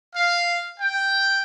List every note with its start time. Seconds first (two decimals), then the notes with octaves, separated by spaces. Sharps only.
0.15 F5
0.80 G5